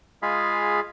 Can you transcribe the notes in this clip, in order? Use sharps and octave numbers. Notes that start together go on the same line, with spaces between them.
G#3 F4 G#4 F5 B5